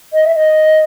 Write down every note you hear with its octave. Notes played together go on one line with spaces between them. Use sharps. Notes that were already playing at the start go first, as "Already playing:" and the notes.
D#5
E5
D#5